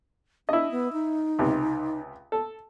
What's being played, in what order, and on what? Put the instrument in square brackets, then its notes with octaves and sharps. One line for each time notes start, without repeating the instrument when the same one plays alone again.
[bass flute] D4 [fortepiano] E4 D#5
[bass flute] B3
D#4
[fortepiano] C#2 C3
A4